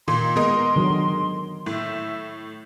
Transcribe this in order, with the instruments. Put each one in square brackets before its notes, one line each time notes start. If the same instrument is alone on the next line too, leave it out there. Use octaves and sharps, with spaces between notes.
[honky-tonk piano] A#2 [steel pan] D#3 [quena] C6
[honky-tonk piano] G#3 A#4 D#5 [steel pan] B3
[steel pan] D3 D#3 F#3
[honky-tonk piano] A2 [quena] E5